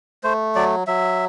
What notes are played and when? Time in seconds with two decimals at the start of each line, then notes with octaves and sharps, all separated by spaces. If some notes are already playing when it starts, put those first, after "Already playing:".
0.24 A3 C5
0.55 F#3 D5
0.87 F#3 E5